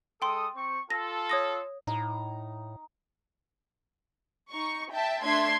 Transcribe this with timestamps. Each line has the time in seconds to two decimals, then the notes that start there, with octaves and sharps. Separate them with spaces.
0.22 G#3 A4 G5 C6 D#6
0.55 C4 C#6
0.90 F4 A4 A#6
1.30 C#5 D#6 A#6
1.87 A2 D#4 A#5
4.50 D#4 C#6
4.91 E5 G5 A5
5.24 A3 D4 E5 C6 G#6